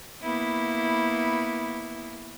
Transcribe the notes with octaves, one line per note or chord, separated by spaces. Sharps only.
A#3 B3 E4